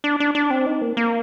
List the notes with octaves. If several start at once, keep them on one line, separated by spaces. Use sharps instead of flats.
D4
D4
D4
C4
D#4
A#3
A#3